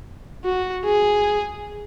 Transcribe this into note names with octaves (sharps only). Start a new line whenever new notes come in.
F#4
G#4